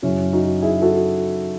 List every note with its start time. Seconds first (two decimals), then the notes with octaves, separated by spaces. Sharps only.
0.02 F#2 C#3 F#3 C#4 E4
0.33 D#4 F#4
0.62 E4 G#4
0.82 F#4 A4